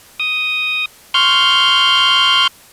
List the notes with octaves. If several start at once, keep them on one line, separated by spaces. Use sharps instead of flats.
D#6
C6 C#6 F6 G6